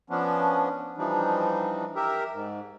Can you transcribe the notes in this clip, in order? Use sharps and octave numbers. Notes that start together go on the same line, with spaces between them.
F3 B3 C#4 D4
E3 F3 G3 D4 D#4
G4 A#4 E5
G#2